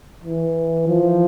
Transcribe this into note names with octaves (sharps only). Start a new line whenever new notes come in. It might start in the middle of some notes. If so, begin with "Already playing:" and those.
E3
F3